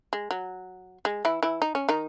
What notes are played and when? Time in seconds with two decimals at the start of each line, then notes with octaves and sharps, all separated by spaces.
0.13 G#3
0.31 F#3
1.05 G#3
1.25 E3 E4
1.43 E3 E4
1.62 D#4
1.75 C#4
1.89 D#3 D#4